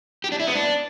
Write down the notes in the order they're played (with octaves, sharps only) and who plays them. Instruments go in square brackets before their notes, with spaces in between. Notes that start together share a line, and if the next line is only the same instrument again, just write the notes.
[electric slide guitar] G4
D4
E4
B3
D4